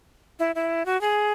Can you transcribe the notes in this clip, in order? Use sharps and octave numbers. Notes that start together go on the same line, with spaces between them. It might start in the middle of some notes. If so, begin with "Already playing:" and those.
E4
E4
F#4
G#4